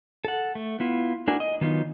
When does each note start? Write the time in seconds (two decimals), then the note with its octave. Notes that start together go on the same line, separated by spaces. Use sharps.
0.25 A4 F#5
0.55 A3
0.80 B3 E4 F4
1.27 A3 D4 E4 F#4 A#4 G#5
1.40 D#5
1.61 D#3 F#3 B3 D#4 F4